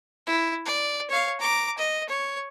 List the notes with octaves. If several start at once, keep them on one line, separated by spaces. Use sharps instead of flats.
E4
D5
C#5 F5
A#5 D6
D#5
C#5